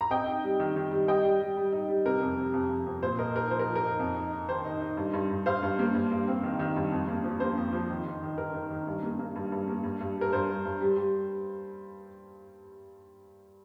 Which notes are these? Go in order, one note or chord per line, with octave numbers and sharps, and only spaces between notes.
A#5
C4 D#5 G5
D#4
G3
D#3
D#3
G3
G3 D#5 G5
G3
G3
G3
D#4
G3
C3 A#4
F2
C3
F2
F2
F2
A#2 C5
A#2 A#4 D#5
D#4 A#4
F3 C5
A#4
F3
A#4
D#4
F2
D#4
D#4
D#3 C5
D#4
D#4
G2
G2
G2
G2 C5 F5
G2
A#3
G2
G2
C4
D#3
D#3
G2
F2
A#3
F3
A#3 C5
F2
F3
D#3
D#3
D#3
D#3 A#4
D#3
D#3
G2
A#3
A#3
G2
G2
A#3
G2
G2
G3
A#4
G2 C5
G2
G2
G3
G3